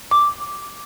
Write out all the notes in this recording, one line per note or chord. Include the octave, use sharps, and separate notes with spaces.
D6